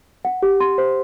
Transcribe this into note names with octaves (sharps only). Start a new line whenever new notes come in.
F#5
G4
C6
C5